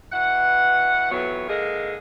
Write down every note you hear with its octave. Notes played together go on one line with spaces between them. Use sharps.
B2 E3 F#5
F2 E3 F#3 B3 C#5
D3 G#3 A#3 G#4